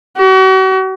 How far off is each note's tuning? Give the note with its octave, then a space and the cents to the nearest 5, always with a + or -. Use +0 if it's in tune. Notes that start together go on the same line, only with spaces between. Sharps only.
F#4 +40